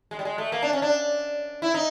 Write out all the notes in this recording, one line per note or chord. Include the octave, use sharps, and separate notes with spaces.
G#3
G3
G#3
A3
A#3
D4
C#4
D4
E4
D#4